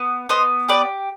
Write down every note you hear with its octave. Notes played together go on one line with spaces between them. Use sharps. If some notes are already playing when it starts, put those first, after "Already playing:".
Already playing: B3
B3 C5 D#5
G4 B4 D5